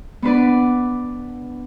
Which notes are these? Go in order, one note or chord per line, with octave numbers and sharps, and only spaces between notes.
B3 D4 B4 D5